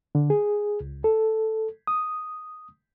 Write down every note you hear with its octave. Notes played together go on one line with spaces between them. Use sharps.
D3
G#4
C#2
A4
D#6